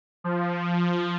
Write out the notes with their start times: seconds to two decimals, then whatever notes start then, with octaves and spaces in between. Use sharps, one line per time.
0.24 F3